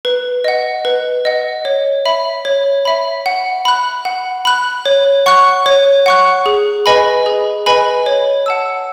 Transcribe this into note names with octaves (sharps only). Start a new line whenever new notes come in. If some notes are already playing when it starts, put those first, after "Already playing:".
B4
D#5 F#5
B4
D#5 F#5
C#5
E5 B5
C#5
E5 B5
F#5
B5 F#6
F#5
B5 F#6
C#5
F#5 C#6 F#6
C#5
F#5 C#6 F#6
G#4
B4 D#5 G#5 B5
G#4
B4 D#5 G#5 B5
C#5
F#5 A5 E6